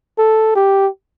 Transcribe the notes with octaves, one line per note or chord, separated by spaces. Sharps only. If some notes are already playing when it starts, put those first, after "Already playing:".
A4
G4